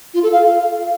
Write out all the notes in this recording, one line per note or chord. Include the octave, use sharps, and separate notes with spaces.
F4
A4
F5